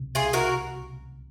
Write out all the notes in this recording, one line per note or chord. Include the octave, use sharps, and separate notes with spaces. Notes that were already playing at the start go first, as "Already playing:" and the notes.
Already playing: C2 C3
C2 F4 G#4
F#4 A#4